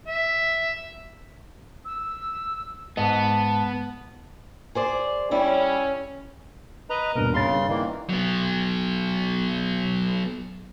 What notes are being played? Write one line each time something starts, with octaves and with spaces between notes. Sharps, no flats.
E5
E6
G#2 B3 D#5 A5
G#4 C5 D5
G3 C#4 E4
B4 D#5 A#5
D#1 G2 B2 A#4
C#3 B5 C6 A6
G2
D#3 E3 A#3 D5
F#3 B3